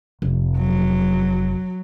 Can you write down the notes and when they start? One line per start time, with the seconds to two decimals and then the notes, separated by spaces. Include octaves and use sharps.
0.22 F1
0.58 F#3